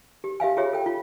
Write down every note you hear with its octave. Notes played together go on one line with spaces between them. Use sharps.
G4
G4 E5 F5 G#5
F4 G4 G#4 C#5 E5
A4 G5
F4